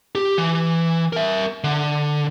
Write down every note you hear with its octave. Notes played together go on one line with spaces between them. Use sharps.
G4
E3
A#4 E5
D3